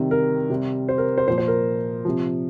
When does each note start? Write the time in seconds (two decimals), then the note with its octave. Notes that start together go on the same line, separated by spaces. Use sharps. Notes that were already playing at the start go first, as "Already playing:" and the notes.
Already playing: C3 D#3 G3
0.11 A#4
0.50 C3 G3
0.89 C5
0.98 A#4
1.18 C5
1.28 A#2 F3 C5
1.38 C5
1.48 A#4
2.05 C3 F3